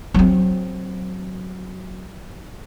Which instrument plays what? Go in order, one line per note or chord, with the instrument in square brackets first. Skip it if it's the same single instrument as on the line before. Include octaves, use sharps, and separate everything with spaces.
[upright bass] F#3 C4